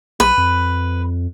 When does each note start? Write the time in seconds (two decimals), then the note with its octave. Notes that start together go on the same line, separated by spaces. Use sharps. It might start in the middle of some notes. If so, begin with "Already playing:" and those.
0.20 B1 B4
0.38 F2